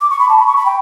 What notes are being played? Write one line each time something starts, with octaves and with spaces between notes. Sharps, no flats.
D6
C#6
B5
A5
B5
C#6
B5
G5